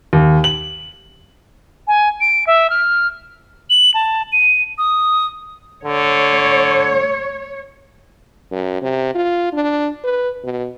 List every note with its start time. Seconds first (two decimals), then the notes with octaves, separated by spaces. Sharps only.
0.13 D#2
0.44 F#7
1.87 G#5
2.21 D7
2.47 E5
2.70 F6
3.70 F#7
3.94 A5
4.32 D#7
4.78 D#6
5.85 D3 C#5
8.52 F#2
8.82 C3
9.15 F4
9.53 D4
10.04 B4
10.44 B2